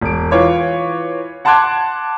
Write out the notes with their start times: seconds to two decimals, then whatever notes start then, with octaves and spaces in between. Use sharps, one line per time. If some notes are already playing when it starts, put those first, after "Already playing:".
0.02 E1 D7
0.31 E3 F4 C#5 D6
1.45 F#5 A5 C6 D6 F#6 G#6